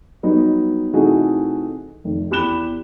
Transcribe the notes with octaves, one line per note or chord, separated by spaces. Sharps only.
F#3 G3 B3 D#4
C3 E3 A3 D#4 F#4 G#4
F1 D#3
E2 G4 B5 F#6 E7 G7